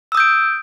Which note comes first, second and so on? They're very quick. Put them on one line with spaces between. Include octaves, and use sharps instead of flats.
E6 D#6 G6 D7